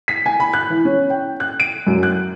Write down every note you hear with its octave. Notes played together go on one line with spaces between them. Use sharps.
B6
G#5
B5
F#6
E3
C#4
G5
F#6
D7
F#2
F#6